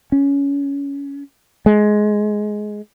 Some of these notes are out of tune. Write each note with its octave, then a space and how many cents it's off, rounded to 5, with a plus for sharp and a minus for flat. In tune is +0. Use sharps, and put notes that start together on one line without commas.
C#4 +20
G#3 +15